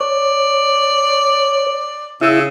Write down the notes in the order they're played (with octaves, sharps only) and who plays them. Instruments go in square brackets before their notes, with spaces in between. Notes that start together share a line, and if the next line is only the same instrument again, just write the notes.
[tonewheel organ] C#5 [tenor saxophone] D5
[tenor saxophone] C#3 [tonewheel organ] E4 E6